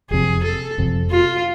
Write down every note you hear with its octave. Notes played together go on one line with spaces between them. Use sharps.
F1 F2 C3 G#4
A4
F1 F2 C3
F4